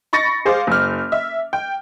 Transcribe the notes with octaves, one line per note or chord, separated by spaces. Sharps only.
B5 C#6 A6 A#6 C#7
G#4 C5 F5 D6
F#1 F6
E5
G5